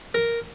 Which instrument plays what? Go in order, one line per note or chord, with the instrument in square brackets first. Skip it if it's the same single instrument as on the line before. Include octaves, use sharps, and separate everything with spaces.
[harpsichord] A#4